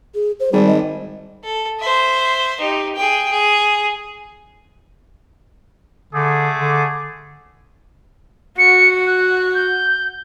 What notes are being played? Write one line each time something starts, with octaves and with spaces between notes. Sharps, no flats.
G#4
C5
G#1 G3 G#4
D#5
A4
C5 E5
D#4 G4
G#4 G5
G#4
D3 A3 G#4 D6
D3
F#4 C#7
F#6
G6